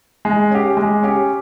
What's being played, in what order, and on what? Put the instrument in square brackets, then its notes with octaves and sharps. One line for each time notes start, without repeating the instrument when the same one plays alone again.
[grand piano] G#3
C#4 G4
G#3
C#4 G4